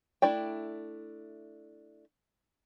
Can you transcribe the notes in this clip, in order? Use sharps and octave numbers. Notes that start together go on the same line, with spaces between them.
A3 D4 E4 D5 G5